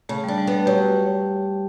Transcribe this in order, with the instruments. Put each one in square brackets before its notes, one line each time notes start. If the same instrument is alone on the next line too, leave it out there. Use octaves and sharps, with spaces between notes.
[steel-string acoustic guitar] C#3 [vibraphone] A3
[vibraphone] G3 [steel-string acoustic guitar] D4
[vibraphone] G3
[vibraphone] A3 [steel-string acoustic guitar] B3
[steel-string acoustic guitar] F#3 [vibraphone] G4